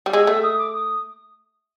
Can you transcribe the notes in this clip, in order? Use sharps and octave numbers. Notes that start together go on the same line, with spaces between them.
G3
G#3 E6
A3
D#6
D6
D#6